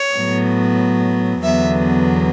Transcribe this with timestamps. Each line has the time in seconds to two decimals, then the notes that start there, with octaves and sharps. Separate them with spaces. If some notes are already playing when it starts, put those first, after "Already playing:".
Already playing: C#5
0.13 A2 F#3 B3
1.42 E2 D3 F#3 B3 E5